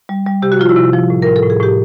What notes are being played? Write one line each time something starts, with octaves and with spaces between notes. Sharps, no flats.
G3
G3
C3 G4
F#4
F3 F4
E4 F#4
C3
F3
A2
A2 A#4
A4
A2
G#4
A2 G4